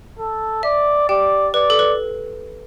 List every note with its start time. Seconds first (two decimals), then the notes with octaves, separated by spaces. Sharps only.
0.19 A4
0.63 D5 E5
1.09 G4 D5 G5
1.54 B4 D5
1.70 A4
1.79 B4